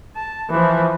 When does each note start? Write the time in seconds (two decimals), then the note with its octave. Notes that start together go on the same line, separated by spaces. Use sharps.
0.15 A5
0.50 E3 F3